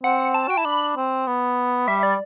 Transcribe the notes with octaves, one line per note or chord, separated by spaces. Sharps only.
C4 F#5
A5
F#4 G5
E4 A5
D4 B5
C4
B3
G3 E5
D5